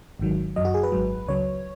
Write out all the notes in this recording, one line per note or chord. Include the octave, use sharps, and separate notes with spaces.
G#1 G#2 D#3 F#3
F#2 F#3 D#5
F#4
G#4
B4
G#1 G#2 F#3
C#2 C#3 F#3 C#5